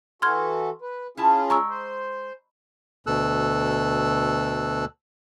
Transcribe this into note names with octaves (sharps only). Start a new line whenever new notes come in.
E3 F#4 A4 C6 F6 G#6
B4
C#4 E4 F4 G#4 A5
G#3 A#5 C#6 E6
C5
D2 B2 A4 E6 F#6